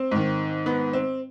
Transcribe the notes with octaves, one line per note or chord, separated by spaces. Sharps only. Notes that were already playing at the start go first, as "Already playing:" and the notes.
Already playing: C4
G#2 D#3
B3
C4